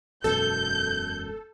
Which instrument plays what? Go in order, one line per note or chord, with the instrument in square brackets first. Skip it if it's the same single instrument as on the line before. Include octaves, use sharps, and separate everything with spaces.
[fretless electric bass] E1 F#2 B2 [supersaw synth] A4 [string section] G6